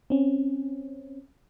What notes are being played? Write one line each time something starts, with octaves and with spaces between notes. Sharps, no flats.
C4 C#4